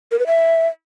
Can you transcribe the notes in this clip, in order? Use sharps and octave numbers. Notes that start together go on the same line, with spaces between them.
A#4
B4
E5